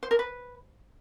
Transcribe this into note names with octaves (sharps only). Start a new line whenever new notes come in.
C5
A#4
B4